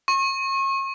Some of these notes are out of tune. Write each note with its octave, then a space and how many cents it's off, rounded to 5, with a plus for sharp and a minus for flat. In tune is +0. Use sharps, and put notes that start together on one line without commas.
C#6 -35